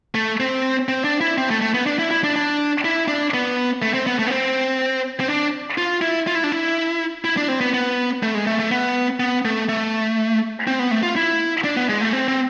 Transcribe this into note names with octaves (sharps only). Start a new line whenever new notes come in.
A3
C4
C4
D4
E4
C4
A3
A3
B3
D4
E4
E4
D4
D4
E4
D4
B3
A3
C4
B3
A3
B3
C4
C4
D4
F4
E4
F4
E4
D4
E4
E4
D4
C4
B3
B3
A3
G#3
A3
A3
B3
B3
A3
A3
C4
B3
A3
F4
E4
D4
B3
G#3
A3
C4
C4